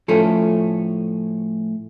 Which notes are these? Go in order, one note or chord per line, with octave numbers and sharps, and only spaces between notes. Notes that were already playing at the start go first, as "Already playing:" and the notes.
A2 F3 A3 C#4 A4